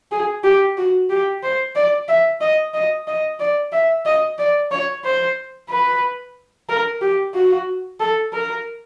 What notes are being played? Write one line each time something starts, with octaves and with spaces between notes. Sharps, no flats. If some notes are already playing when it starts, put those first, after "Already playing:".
G#4
G4
F#4
G4
C5
D5
E5
D#5
D#5
D#5
D5
E5
D#5
D5
C#5
C5
B4
A#4
G4
F#4
A4
A#4